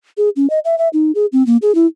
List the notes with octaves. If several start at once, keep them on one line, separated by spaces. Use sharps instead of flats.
G#4
C#4
D#5
E5
E5
D#4
G#4
C4
A#3
G#4
E4